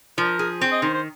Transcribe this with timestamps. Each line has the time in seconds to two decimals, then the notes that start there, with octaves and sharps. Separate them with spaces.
0.18 F3 A#4
0.39 G#4
0.61 C4 C5
0.72 D#5
0.82 D#3 C5
0.94 C5